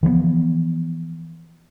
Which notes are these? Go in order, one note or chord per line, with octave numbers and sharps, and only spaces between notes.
E3 F3 G#3 B3